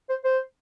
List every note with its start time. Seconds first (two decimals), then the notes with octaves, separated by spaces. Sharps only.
0.10 C5
0.25 C5